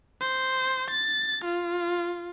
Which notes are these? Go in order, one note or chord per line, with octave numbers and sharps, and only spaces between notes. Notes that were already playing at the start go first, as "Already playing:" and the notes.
C5
A6
F4